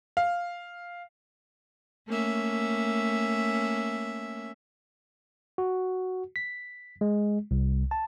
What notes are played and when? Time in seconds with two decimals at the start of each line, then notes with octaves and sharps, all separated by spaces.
0.17 F5
2.08 A3 A#3 C#4 E5
5.58 F#4
6.36 B6
7.01 G#3
7.51 C2
7.91 A5